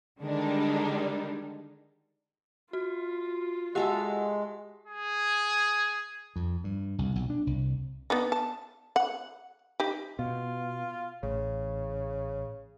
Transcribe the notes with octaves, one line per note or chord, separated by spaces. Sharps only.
D3 D#3 G3 G#3 D4 D#4
F4 F#4
G#3 F#4 G4 A4 E5 F#5
G#4
F2
G2
C2
B1
D4
C2
B3 D4 D#4
A5
F#5
D#4 G4
B2 F4
A1 C#3